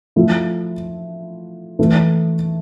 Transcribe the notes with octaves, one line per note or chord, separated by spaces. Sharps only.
F3 A3 E4
E3 A3 E4